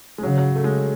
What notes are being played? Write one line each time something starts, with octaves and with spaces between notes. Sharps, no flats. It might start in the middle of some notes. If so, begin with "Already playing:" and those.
G#3
C#3 F#3
F#3
A3
G#3